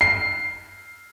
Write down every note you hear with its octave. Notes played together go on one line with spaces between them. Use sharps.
C7